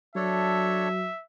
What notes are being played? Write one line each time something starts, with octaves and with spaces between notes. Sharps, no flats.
F#3 D4 A4 C#5 E5